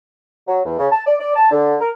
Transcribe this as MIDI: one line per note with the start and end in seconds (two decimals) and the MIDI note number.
0.47 0.60 54
0.65 0.76 40
0.79 0.87 49
0.91 1.01 81
1.06 1.14 74
1.19 1.33 74
1.35 1.50 81
1.51 1.75 50
1.80 1.89 70